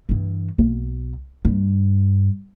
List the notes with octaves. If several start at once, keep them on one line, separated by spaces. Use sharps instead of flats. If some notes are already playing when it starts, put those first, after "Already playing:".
G2 E3
B1
G2